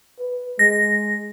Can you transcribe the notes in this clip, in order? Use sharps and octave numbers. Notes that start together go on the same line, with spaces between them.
B4
G#3 A#6